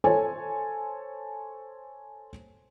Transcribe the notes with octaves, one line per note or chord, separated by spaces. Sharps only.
A4 C5 C#5 G#5